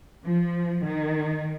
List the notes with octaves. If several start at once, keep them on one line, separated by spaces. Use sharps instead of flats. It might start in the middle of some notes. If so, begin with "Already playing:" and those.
F3
D#3